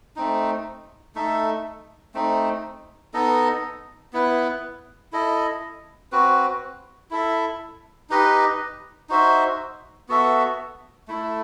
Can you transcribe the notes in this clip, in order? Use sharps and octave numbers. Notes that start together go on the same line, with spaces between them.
A3 C4 D#4
A3 D#4 A4 E5
A3 C4 D#4
B3 D#4 A4 D#5
B3 E4 B4
E4 A4 D#5
C4 F#4 B4
E4 A4 E5
D#4 G4 B4 D#5
D#4 F#4 C5 E5
B3 F#4 A4 E5
A3 E4 A4